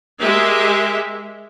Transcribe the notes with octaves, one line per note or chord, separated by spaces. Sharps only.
G#3 G4 A#4 E5